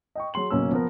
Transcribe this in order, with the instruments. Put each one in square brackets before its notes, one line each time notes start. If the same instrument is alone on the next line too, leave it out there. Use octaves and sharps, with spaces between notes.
[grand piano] D#5 G5 C#6
F#3 G#4 C6 F#7
F#1 B2 A#3 C#4 E6
F3 B3 A#4